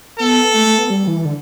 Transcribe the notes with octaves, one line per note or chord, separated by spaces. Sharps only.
B3 A4
A3
A3
B3
G3
E3
D3